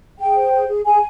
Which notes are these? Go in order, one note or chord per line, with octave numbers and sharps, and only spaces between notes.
G#4 G5
C5
G#4
G#4
G#4 G#5